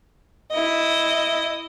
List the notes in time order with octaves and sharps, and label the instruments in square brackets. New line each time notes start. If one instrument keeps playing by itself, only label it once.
[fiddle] E4 D#5